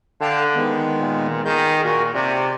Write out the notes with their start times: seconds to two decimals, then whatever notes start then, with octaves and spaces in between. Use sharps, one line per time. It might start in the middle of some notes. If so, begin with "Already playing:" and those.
0.21 D3 F5 G5 A5
0.55 D#3 G#3 B3
1.00 A#2
1.45 D#3 G#4 G6
1.84 A#2 F#4 A#4
2.15 C3 D5